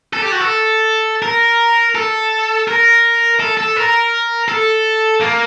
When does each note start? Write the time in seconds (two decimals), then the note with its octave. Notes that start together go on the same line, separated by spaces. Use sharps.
0.13 A4
0.22 G4
0.32 F#4
0.40 A4
1.22 A#4
1.95 A4
2.68 A#4
3.40 A4
3.58 A4
3.77 A#4
4.48 A4
5.21 A#3